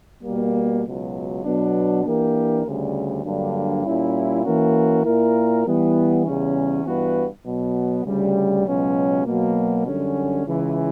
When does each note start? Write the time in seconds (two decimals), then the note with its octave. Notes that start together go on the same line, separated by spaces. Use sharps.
0.23 B2 G3 A#3
0.83 C#2 B2 F#3
1.43 B2 F#3 B3 D4
2.04 E3 A#3 D4 G4 A#4
2.63 D2 C#3 G3
3.23 G2 D3 F#3 A#3 D4
3.84 A#2 G3 C#4 E4
4.44 E3 A#3 C#4 F#4 A#4
5.03 A#2 A#3 E4 A#4
5.63 E3 G3 B3 E4
6.24 E2 C#3 G3 C#4
6.84 G2 E3 B3 F#4 B4
7.44 B2 F#3 B3
8.04 D2 C#3 G3
8.65 C#2 B2 F#3 C#4
9.25 B2 F#3 A#3
9.85 F#2 D3 G3 C#4
10.45 C#2 C#3 E3